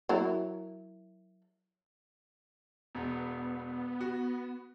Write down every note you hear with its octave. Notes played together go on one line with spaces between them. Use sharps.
F#3 E4 A#4
E1 B3
F#4